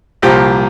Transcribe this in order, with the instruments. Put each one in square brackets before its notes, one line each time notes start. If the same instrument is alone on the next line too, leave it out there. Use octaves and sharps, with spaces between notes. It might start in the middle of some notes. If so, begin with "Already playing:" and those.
[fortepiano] C2 A#2 F3 G4